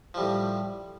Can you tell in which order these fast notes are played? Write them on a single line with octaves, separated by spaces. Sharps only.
F3 G3 A2